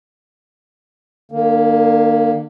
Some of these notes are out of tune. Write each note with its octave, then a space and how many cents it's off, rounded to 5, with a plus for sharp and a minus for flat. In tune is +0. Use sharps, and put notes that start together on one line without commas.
D3 +45 A#3 +0